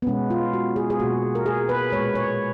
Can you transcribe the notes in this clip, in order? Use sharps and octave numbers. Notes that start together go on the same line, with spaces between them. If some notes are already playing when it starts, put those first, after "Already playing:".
B3
B2 G#3 C#4
F4
F#4
G#4
G#4
B2 A#3 F#4
A#4
G#4
B4
A#2 G#3 C#5
C#5